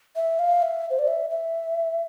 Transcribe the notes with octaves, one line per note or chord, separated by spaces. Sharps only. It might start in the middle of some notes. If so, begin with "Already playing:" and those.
E5
F5
E5
C5
D5
E5
E5